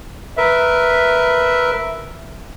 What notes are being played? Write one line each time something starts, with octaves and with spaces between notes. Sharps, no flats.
A#4 B4 E5